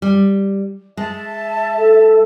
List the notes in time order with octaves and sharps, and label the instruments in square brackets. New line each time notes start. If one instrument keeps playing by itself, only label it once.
[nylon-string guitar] G3
[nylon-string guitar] G#3 [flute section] E5 A5
[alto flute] A4